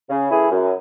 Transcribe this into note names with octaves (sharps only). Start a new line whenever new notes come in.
C#3
E3 A3 E4 G#4
F#2